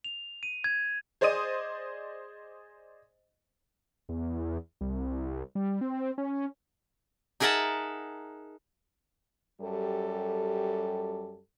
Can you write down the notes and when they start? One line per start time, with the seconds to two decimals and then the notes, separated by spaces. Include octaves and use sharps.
0.04 F7
0.43 D#7
0.64 G#6
1.21 G#4 C5 D5 D#5 D#6 D#7
4.09 E2
4.81 C2
5.55 G3
5.81 C4
6.18 C#4
7.40 D#4 G#4 A#4 E5 F#5 A5
9.61 F#2 G3 G4 A4